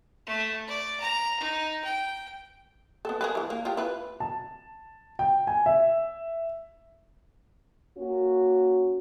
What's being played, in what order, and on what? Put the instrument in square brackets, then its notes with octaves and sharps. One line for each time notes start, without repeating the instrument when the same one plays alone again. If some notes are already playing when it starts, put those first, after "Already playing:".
[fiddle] A3
D5
A#5
D#4
G5
[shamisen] B3 A4
G#4 A#4 B4
E3 G#3
A#3
F4 G4
E4 F4 B4
[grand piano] A5
G5
G#5
E5
[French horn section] A#3 C#4 F#4